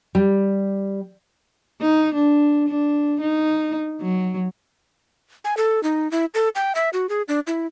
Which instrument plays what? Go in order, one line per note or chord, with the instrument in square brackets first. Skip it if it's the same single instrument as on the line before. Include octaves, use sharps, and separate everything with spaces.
[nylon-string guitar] G3
[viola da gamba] D#4
D4
D4
D#4
F#3
[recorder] G#5
A4
D#4
E4
A4
G5
E5
F#4
G#4
D4
E4